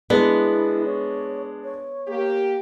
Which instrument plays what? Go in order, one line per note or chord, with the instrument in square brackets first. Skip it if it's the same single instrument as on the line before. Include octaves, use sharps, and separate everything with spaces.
[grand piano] G#3 D4 [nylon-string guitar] B3 [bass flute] E4
[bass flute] C#5
C#5
[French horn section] A#3 G4